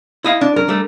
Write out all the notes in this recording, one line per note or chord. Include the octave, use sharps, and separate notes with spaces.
E4 D#5 F5
D4
F#2 A#4
G3 A3